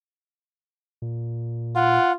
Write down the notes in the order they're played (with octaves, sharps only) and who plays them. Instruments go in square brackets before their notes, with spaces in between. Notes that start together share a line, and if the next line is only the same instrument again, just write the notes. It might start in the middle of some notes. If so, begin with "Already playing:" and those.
[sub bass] A#2
[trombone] F4 [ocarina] F#5